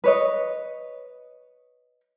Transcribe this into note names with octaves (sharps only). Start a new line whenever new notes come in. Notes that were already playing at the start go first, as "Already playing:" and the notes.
B4 C#5 D#5